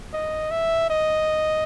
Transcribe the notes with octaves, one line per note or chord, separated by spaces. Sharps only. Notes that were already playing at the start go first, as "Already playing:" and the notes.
D#5
E5
D#5